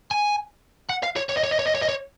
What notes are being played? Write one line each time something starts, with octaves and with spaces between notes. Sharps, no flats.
G#5
F#5
F5
C#5
C#5
D#5
C#5
D#5
C#5
D#5
C#5
D#5
C#5